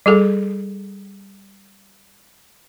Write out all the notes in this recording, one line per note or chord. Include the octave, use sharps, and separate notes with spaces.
G3 G#4 A4